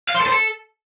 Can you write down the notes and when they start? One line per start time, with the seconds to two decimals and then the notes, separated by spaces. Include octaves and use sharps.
0.09 F5
0.15 C5
0.20 A4
0.26 C5
0.32 A4